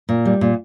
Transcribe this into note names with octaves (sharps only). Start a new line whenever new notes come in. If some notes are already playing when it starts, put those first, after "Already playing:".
A#2
G3
A#2